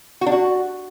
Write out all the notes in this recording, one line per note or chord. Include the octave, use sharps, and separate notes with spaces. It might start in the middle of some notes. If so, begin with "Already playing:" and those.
F#4
D4
F#4